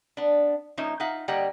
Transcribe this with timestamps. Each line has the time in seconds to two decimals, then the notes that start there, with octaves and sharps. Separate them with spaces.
0.17 B3 D4
0.77 F3 A#3 C#4 D#4 E5
1.00 D#4 F4 E5 F#5
1.28 D3 G3 A#3 G4 D#5 F#5